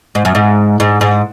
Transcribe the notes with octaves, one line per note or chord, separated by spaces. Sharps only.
G#2
F#2
G#2
G#2
G#2